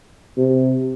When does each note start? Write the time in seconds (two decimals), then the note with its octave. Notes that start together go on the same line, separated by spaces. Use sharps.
0.38 C3